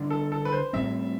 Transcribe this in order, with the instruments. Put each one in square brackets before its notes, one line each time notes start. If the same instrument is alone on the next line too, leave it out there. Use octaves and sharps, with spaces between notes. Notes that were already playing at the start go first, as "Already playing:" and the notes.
Already playing: [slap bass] D3 G3 D4
[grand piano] A4
A4
B4
C5
[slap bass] A2 G3 C4 [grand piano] E5